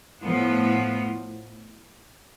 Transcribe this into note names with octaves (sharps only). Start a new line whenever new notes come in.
A2 F3 B3